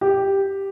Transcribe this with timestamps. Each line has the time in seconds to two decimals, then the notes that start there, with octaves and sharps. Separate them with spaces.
0.01 G4